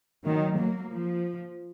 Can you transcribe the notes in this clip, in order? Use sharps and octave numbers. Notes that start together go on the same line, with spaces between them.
D#3 F#3
F#3 A#3
F3